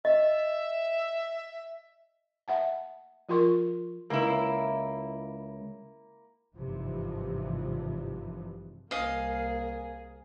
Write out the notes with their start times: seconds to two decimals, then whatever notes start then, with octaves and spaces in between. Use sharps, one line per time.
0.05 D#5 E5
2.48 E5 F#5 A5
3.29 F3 F4 A#4 C6 C#6
4.10 C#2 A#3 E4
6.56 G#1 G2 C3 E3 F3
8.91 C2 A#3 G#4 D#5 F5